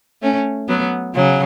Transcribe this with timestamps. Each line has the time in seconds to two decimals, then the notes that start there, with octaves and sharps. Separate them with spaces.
0.22 A3 C#4
0.68 F#3 B3
1.15 C#3 F#3